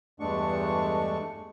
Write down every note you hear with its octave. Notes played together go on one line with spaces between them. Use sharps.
E2 G2 G#3 A3 D4 C#6